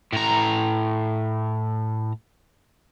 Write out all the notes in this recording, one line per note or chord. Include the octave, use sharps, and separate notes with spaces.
A2 A#5